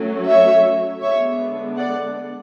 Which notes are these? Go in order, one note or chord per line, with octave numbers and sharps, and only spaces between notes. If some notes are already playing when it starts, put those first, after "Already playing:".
Already playing: F#3 A3 C#4
C#5 E5
D3 G#3 B3 D4 C#5 E5
D5 F#5